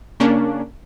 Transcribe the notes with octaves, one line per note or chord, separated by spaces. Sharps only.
C#3 A#3 C#4 D4